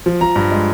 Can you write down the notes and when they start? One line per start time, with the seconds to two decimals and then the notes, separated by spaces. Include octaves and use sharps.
0.06 F3
0.21 F3 A#5
0.36 G2 A#5
0.51 G#3